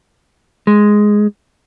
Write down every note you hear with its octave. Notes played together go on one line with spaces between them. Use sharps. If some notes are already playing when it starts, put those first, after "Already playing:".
G#3